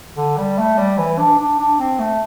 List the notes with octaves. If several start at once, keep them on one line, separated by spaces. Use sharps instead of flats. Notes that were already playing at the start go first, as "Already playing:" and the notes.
D3
G3
A3
G3
E3
D4
D4
D4
C4
A3